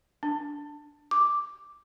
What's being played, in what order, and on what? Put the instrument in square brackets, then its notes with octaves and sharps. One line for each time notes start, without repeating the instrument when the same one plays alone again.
[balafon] D4
[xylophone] D6